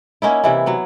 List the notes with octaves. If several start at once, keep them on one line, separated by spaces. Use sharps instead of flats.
A#3 C#4 D#4 E4
C3 E3 E4
F#3 B3